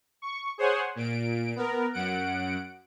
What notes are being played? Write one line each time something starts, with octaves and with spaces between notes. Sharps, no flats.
C#6
G#4 C5 C#5 F#5 G#5
A#2 D7
B3 A#4
F#2 F#5 D7